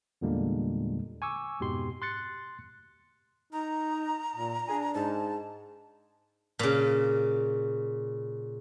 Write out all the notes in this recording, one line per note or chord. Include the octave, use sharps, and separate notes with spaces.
E2 A#2 D3 G3 G#3 A#3
G#5 C#6 D6 E6
F2 G#2 B2 G4 C6
C6 F#6 A6 C#7
D#4 A#5
A#2
D4 G#4
G#2 A5
A#2 C#3